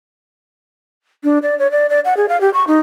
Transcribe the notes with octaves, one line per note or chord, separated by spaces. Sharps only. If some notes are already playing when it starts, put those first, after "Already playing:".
D4
D5
C#5
D5
D5
F#5
G#4
F5
G4
C#6
D#4